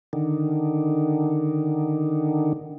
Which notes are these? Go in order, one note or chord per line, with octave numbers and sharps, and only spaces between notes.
D3 D#3